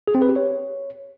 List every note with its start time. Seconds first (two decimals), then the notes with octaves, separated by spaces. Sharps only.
0.08 G#4
0.15 C4
0.22 B4
0.29 G4
0.36 C#5